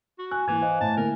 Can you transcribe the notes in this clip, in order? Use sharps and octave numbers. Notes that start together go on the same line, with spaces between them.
F#4
G#5 F#6
G#2 E3 A#3 E4 G#6
C5 D#5 F5
A2 A5
A2 D3 A#3 E4 A#4 G#5